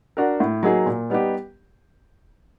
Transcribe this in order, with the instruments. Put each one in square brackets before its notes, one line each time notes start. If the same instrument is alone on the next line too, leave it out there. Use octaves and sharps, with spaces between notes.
[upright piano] D4 F#4 A#4
A2
F#3 A#3 D#4 G#4
A#2
G3 B3 D#4 G4